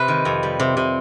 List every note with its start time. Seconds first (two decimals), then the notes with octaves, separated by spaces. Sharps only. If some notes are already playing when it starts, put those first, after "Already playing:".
Already playing: C3 B4
0.08 D#3
0.25 F2
0.43 G3
0.60 C3
0.77 C3